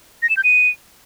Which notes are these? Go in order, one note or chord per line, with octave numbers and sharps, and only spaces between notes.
A#6
E7
G6
D#7